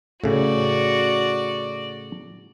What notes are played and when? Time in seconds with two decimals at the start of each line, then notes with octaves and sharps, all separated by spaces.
0.24 A2 C#3 F#4 D5